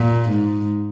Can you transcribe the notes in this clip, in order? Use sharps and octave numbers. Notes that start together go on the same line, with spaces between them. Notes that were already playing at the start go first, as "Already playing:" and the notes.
Already playing: A#2
G#2